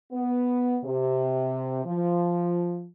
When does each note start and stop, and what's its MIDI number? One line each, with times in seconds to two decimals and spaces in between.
0.13 0.78 59
0.83 1.85 48
1.85 2.88 53